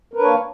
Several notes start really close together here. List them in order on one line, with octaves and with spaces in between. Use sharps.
A#4 B4 D4 C#5 A#3